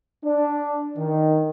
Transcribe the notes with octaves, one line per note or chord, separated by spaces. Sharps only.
D4
D#3